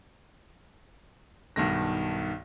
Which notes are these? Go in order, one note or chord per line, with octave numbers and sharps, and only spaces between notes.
B1 G2 D#3 A#6